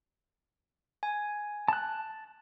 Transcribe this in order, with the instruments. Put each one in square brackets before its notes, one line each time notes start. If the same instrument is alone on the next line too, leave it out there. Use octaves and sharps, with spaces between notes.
[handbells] G#5
[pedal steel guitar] A5 F#6